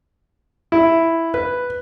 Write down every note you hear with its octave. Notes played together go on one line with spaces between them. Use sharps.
E4
B4